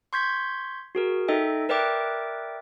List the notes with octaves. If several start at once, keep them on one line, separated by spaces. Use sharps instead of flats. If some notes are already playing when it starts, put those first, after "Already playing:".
C6 C#6 G6 G#6 B6
F#4 G#4 A#4
D#4 A4 D#5 E5 G5
A#4 B4 D5 E5 G5 D6